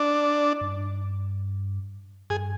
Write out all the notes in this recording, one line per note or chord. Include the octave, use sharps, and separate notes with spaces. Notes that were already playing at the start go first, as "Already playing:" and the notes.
Already playing: D4
G2
G2 G#4